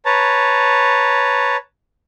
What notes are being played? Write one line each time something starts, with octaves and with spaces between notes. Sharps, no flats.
B4 C#5 A5 A#5